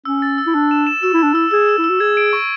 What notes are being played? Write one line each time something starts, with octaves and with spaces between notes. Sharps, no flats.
C#4 E6
A6
E6
E4
D4 E6
E7
E7
F#4 E6
E4
D4 E6
E4 E6
G#4 E6
E6
E4
E6
F#4
G#4 G#6
D7
C#6